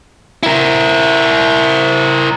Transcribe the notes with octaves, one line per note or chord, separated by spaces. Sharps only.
E4 A#4